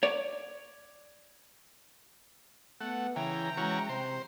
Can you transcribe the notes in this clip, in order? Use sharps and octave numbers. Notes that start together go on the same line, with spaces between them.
C#5 D5
A3 B3 F#5
C#3 E3 E4 G5 A#5
E3 G#3 C#4 F#4
C3 C5